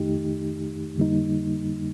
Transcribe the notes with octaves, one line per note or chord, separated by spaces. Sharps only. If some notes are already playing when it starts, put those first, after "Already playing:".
Already playing: F2 D#3 A3 D#4 G4
F2 D3 G3 A#3 D#4